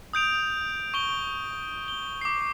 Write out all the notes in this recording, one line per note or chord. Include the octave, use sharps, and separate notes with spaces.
D#6 G6 D7 F7
C#6 D7 G7
G7
D6 C7